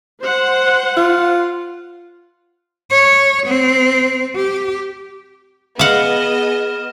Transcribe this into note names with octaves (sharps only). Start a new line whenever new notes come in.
C5 F#5
F4
C#5
C4
G4
B3 G#4 D#5 F5 F#5 F6 E7